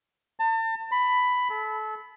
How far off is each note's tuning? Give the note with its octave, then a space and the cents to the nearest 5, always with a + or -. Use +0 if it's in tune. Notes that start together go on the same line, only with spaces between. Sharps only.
A5 +35
B5 +10
A4 -30